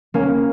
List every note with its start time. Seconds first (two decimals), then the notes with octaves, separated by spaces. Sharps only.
0.14 A#3 C#4